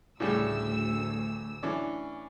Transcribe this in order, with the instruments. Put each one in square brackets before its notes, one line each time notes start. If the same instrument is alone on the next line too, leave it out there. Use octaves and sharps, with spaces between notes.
[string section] A1 D2 E6 [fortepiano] A2 C#3 G3
[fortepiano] E3 C#4 D4